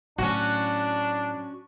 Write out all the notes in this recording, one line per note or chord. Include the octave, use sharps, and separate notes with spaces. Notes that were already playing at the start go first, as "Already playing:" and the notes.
A2 F#3 C#4 D4 F#4